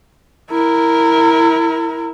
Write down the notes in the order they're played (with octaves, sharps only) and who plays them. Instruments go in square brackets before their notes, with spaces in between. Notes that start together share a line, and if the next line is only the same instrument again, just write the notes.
[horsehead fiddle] E4 A#4